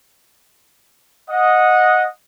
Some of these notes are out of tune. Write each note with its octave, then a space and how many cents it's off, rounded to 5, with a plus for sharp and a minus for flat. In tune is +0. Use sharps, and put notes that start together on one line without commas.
D#5 +0 F#5 -20